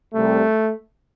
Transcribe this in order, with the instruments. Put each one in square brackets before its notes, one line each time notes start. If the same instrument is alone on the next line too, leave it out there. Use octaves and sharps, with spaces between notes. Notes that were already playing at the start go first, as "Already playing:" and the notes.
[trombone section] C2 C3 G3 A3